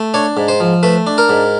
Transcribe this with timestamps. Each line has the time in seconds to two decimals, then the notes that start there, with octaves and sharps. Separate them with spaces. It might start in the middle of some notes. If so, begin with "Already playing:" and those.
Already playing: A3
0.14 D4 C#5
0.37 G#2
0.48 C5
0.60 F3
0.83 A3 B4
1.07 D4
1.18 A#4
1.29 G#2